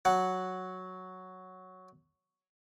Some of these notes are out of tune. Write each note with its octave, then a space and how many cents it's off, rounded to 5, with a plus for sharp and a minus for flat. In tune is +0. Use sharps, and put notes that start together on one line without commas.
F#3 +0 F#5 +0